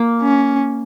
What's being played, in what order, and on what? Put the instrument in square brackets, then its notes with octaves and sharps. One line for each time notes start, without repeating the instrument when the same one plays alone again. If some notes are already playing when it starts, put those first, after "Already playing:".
Already playing: [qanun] A#3
[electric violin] C#4